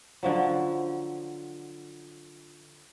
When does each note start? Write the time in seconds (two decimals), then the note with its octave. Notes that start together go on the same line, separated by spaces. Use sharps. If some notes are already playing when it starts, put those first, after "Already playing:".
0.23 D3 F3 F#3